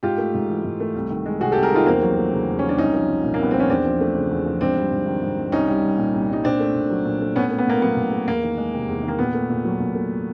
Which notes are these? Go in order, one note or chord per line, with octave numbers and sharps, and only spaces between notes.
G#2 F4 G4
A3
G#2
E3
G#2
A3
C2
D#3
G#3
C3 F#4 G#4
G4 A4
C2
G#4 A#4
D#3 D#4 F4
E2 A#3 C4
F#3
A3
C#3
E2
F#3 C#4
D4
C2 C#4 D#4
F3
C2
A#2
A#3
C2 B3
F3 C4
C#4
E2 C4 D4
F3
A3
C#3
E2
F3
G#2 C4 D4
G3
G#2
D#3
G#2
G3
C2 C#4 D#4
G3
C2
A#2
C2
G3 D#4
A#2 C4 D4
A3
A#2
F#3
A#2
A3
A2 B3 C#4
A3
B3
A2 A#3
F#3 B3
A2
A3
E2 A#3
D#3
G#3
C3
E2
D#3
A#3
A#2 B3
A3
A#2
F#3
A#2
A3